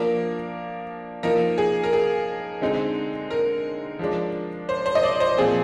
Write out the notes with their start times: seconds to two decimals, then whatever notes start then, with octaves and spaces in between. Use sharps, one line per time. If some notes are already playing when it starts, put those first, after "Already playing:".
Already playing: F3 A#3 D4 A#4
1.23 F3 A#3 D#4 A#4
1.58 G#4
1.84 A#4
1.93 G#4
2.61 D3 G#3 C4 D#4
3.31 A#4
3.99 F3 G#3 D4
4.69 C5
4.86 C5
4.95 D#5
5.04 D5
5.20 C5
5.38 A#2 F3 C4 G#4